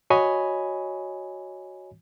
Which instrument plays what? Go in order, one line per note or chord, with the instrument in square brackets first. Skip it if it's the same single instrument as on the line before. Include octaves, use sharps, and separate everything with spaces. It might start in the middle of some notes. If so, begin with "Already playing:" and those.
[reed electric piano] F#4 C#5 D#5 G#5 B5